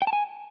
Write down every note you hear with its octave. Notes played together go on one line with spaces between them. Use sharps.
G5
A5
G#5